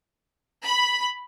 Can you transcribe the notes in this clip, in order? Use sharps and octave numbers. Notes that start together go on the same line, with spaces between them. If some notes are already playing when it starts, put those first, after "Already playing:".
B5